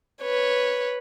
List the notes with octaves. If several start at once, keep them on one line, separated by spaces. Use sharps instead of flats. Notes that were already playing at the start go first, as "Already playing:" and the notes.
B4 C#5